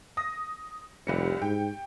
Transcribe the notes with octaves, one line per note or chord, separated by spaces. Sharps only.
D#6 A#6
F1 C2 G3 C#7
G#2 G5